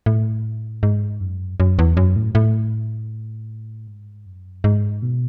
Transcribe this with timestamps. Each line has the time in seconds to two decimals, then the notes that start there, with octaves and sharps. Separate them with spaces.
0.06 A2
0.83 G#2
1.21 F#2
1.60 F#2
1.79 E2
1.97 F#2
2.16 A2
2.35 A2
3.87 G#2
4.26 F#2
4.64 G#2
5.02 B2